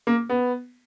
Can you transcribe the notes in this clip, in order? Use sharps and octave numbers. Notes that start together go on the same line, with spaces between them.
A#3
B3